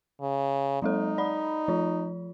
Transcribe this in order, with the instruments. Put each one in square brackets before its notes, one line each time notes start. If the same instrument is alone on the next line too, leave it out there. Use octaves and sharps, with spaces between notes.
[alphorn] C#3
[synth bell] F#3 G#3 A4 [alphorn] D#4
[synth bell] D5 B5
F3 F4